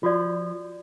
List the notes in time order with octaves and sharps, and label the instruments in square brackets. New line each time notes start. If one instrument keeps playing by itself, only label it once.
[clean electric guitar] F3 [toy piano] F4 F#4 D5